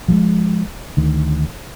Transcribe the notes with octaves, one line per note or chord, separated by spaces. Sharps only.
F3 G3 G#3
D2 D#3